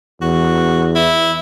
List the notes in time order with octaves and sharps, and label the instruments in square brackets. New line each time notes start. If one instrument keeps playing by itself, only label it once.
[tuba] E2 [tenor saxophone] F#4
[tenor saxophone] E4